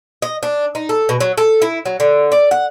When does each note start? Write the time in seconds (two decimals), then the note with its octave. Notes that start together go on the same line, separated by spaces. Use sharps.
0.22 D#5
0.43 D4
0.75 D#4
0.89 A4
1.09 B2
1.20 F#3
1.38 A4
1.62 E4
1.86 F#3
2.00 D3
2.32 D5
2.51 F#5